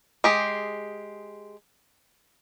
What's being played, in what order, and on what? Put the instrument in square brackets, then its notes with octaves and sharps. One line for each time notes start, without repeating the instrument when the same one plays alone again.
[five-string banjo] G#3 G4 G#4